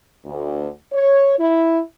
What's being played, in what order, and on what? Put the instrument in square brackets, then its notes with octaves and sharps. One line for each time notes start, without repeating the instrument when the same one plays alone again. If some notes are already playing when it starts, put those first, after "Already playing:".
[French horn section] D2
C#5
E4